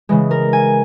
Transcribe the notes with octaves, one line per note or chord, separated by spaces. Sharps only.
C#3 E3 G#3
A#4
G#5